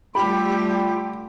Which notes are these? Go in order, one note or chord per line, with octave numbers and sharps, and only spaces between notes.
D3 G3 A3 F4 G4 G5 B5